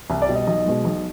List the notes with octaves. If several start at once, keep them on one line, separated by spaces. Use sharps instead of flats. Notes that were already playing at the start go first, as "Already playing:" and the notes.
C2
D5
B2 G3
D#5
B1 D#5
B2 G#3
B1